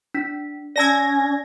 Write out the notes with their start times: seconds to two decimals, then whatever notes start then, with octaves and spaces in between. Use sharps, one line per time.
0.14 D4 B6
0.76 C#4 D5 A5 E6 G#6 A#6